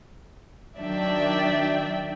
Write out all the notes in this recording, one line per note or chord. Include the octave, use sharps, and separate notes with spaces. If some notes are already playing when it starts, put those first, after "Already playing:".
D#3 F#3 D4 D5 E5 G5